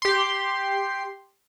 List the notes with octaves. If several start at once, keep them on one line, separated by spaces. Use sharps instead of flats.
G4 C6